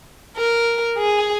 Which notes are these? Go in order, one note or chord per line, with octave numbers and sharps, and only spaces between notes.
A#4
G#4